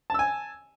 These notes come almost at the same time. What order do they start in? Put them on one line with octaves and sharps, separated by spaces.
A5 E6 G#5